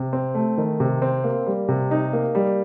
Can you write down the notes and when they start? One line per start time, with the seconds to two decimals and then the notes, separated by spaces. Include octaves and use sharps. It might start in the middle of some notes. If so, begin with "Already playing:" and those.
Already playing: C3
0.13 C4
0.35 A3
0.58 D#3
0.80 C3
1.02 C4
1.24 A#3
1.46 G3
1.68 C3
1.91 D#4
2.13 A#3
2.35 G3